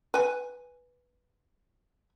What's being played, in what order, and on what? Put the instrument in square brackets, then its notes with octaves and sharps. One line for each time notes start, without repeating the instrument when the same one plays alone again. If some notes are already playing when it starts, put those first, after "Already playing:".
[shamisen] B4 G#5